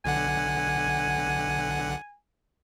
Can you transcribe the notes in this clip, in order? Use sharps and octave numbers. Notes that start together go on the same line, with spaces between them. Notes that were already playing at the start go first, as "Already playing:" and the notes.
B1 D3 F#5 G#5